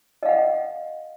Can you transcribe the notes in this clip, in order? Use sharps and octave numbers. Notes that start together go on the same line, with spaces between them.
D#5 F5 F#5